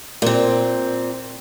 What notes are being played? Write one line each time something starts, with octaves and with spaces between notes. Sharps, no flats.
A#2 C4